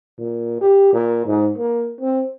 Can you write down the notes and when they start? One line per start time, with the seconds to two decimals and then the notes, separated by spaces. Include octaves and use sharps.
0.19 A#2
0.61 G4
0.93 A#2
1.26 G#2
1.58 A#3
2.01 C4